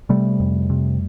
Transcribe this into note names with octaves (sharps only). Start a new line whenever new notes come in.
C3 G3 A3
F2
C3